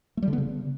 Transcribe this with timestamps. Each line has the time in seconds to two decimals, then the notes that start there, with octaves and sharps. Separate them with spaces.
0.17 A3
0.22 G3
0.28 D3
0.33 B3
0.38 C#3